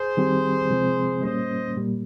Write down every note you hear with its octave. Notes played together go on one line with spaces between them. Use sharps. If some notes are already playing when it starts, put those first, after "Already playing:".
Already playing: G#4 C5
D#3 G3 C4 G4
C3 F3 G#3 C4
A#2 G3 A#3 C#4 C5 D#5
A#2 G3 A#3